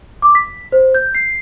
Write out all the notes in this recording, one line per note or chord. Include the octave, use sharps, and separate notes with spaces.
D6
B6
C5
G6
C7